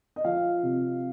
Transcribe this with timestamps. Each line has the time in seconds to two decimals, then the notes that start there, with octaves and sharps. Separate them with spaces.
0.16 D#5
0.25 F3 F5
0.63 C3